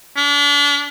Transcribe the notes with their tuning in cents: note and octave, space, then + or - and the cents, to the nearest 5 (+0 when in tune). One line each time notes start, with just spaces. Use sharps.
D4 -35